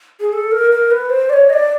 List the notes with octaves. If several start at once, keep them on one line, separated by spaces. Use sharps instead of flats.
G#4
A4
A#4
A#4
B4
C5
D5
C#5
D#5
D5